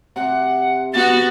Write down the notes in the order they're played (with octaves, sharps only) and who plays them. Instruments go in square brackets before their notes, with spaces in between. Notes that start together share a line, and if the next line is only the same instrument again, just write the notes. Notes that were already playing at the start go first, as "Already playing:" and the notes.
[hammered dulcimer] C3 [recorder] F#5
[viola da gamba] B3 F#4 [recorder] A6